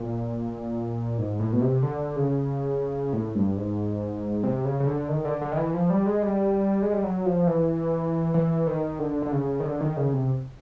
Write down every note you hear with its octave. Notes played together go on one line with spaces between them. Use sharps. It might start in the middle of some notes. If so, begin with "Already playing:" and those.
Already playing: A#2
G#2
A2
B2
C3
D3
C#3
A2
G2
G#2
C3
C#3
C#3
D3
D#3
D3
D3
D#3
E3
F3
G3
G#3
G3
G#3
G3
F#3
F3
E3
E3
D#3
D3
D3
C#3
D#3
D3
D#3
C#3
C3